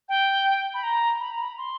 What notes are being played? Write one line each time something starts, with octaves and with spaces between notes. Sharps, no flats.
G5
B5
A#5
B5
A#5
B5
C6